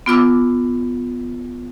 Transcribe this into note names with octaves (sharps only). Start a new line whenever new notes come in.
B3 F4 D6 E6